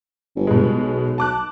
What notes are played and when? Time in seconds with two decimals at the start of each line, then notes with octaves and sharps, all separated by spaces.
0.36 G1
0.47 B2 G#3
0.76 B1
1.18 A5 D6 F#6